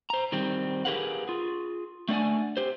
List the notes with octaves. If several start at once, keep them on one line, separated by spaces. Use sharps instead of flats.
C5 A#5
D#3 G3 C4
G4 G#4 A#4 B4 F5 F#5
F4 G#4
A3 D4 D5 F5 F#5 G#5
G4 C5